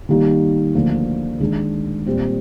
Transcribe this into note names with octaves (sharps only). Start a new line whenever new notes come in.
D#3 G3 A#3 D#4 G4
D2 D3 F3 A#3
D#3 G#3 D4
A#2 G3 C4 G4